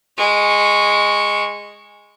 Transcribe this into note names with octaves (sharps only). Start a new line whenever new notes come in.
G#3 C#6